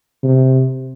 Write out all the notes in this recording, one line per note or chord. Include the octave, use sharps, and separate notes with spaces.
C3